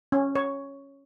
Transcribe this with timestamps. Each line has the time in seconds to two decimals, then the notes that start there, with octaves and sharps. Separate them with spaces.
0.12 C#4
0.35 C#5